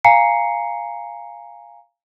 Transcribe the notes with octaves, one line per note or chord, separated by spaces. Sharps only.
F5 G#5 A#5 C7 C#7